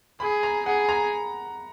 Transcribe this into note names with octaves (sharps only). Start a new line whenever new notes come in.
G#4 B5
A#5
G#4 F#5
A#5